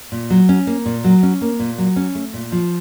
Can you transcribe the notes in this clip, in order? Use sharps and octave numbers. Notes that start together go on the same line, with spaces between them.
A#2
F#3
C#4
A#3
A#2
F#3
C#4
A#3
A#2
F#3
C#4
A3
A#2
F3